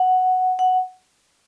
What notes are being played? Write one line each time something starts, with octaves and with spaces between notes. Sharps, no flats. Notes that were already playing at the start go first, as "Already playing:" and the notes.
Already playing: F#5
F#5